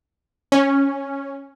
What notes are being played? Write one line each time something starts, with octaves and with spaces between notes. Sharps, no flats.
C#4